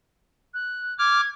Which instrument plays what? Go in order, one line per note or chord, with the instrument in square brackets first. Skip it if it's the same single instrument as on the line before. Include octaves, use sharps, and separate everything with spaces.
[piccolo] F#6
[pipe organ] D6 F6 [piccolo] G#6